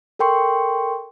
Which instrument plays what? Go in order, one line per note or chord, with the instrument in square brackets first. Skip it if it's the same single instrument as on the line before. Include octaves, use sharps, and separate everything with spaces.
[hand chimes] A4 A#4 G5 C6 C#6